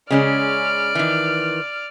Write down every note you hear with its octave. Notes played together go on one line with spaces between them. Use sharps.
C#3 G#3 C#4 D5 F6
D#3 E3